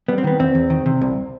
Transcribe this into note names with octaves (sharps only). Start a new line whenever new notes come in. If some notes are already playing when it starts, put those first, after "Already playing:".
G3 B3
C4
D#3 B3
E2 C4
E2
D#3
C3
C2